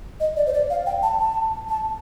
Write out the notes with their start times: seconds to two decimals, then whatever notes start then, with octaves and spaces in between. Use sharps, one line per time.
0.20 D#5
0.37 D5
0.47 C5
0.53 D5
0.70 F5
0.86 G5
1.03 A5
1.20 A5
1.69 A5